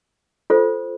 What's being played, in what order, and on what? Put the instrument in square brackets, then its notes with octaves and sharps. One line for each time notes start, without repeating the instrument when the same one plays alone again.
[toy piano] F4 A4 C5